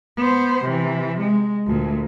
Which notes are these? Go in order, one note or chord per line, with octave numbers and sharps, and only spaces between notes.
B3 C5
C3 E3
G#3
D2 A#2